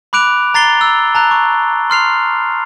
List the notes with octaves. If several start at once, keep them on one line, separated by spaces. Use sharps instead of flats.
B5 D6 F#6 D7 F7
A#5 A6 C7 G7
E6
A5 A#5 F#6
C#6
C6 F6 C7 F7